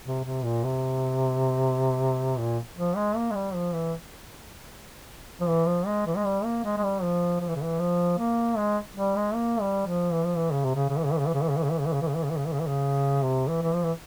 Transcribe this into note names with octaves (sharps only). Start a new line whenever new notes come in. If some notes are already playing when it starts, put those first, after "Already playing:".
C3
C3
A#2
C3
A#2
F3
G#3
A#3
G#3
G3
F3
E3
F3
E3
F3
G#3
E3
G#3
G3
A#3
G#3
G#3
G3
F3
F3
E3
C#3
E3
F3
A#3
G#3
G3
G#3
A#3
G3
F3
E3
F3
E3
C#3
C3
C#3
C#3
E3
C#3
E3
C#3
E3
C#3
E3
C#3
E3
C#3
E3
C#3
E3
C#3
E3
C#3
E3
C#3
E3
C#3
E3
C#3
E3
C#3
C3
E3
E3
F3
E3